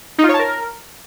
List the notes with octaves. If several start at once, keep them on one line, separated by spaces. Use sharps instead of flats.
D#4
F4
C#5
A5
A#4